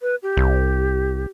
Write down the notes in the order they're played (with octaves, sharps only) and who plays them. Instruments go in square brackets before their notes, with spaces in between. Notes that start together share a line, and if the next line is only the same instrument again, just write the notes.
[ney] B4
G4
[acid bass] C2